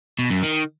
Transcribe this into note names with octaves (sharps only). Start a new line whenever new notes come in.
B2
F#2
D#3